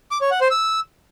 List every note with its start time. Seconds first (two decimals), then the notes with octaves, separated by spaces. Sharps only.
0.11 D6
0.21 C#5
0.31 F#5
0.41 C5
0.51 E6